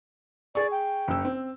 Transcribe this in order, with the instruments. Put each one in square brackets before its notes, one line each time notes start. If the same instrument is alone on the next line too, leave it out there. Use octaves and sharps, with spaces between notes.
[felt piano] G#4 C#6 [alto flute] D5
[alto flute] G5
[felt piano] F#1 E6
C4